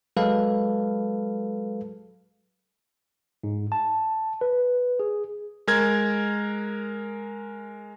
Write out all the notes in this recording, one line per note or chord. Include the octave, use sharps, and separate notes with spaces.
F#3 G#3 A4 B4 F5
G#2
A5
B4
G#4
G#3 A#4 G#6